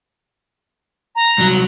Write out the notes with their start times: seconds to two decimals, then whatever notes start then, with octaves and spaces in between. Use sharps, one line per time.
1.16 A#5
1.39 C2 F#3